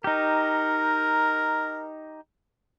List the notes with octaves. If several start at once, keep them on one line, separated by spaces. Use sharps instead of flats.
D#4 G4 A#4